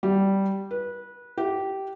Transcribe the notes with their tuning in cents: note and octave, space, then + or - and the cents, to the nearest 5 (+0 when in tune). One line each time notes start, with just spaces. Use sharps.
G3 -10
B4 -20
G4 -15